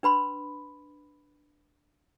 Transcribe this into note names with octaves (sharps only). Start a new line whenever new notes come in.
D4 B4 B5 C6